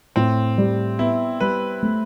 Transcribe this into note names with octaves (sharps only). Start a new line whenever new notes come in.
A2 C4
G3
B3 E4
G3 B4
A3